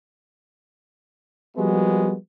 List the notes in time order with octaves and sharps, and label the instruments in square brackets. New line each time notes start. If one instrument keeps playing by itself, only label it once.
[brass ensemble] F3 G3 G#3 A#3 B3 F#4